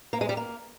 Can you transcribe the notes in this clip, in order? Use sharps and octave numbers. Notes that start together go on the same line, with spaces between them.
A#3
G#3
G3
A#3